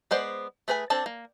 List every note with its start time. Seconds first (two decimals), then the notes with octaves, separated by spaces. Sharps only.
0.11 G#3 B3 C5 D5
0.68 A3 G#4 B4 D5 G#5
0.90 C4 D4 A4 A5
1.06 A#3